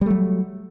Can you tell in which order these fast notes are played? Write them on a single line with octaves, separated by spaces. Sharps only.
G3 A3 F#3